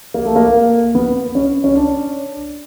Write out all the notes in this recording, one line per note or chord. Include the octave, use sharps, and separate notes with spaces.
A#3
A3
A#3
B3
C#4
C#4
D4